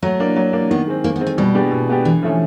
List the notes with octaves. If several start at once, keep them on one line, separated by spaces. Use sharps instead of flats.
F#3 A3
A#3 D4
F#3
A#3 D4
D#3 B3
G#3 C4
D#3 A#3
B3
G#3 C4
A3
B2 G3
G#3 B3 D4 G4
B2
G#3 B3 D4 G4
D3 E3
F3 A3 C#4